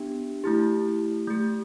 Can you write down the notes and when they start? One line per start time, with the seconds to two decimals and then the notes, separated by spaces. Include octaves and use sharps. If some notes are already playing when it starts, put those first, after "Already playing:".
Already playing: B3 D4 G4
0.44 A3 E4 G4
1.28 A3 G4